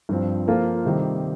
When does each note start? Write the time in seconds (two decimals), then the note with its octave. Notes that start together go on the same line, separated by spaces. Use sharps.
0.09 G2 F3 C4
0.47 F3 A#3 F4 A4 C5
0.85 C3 D#3 G3 C4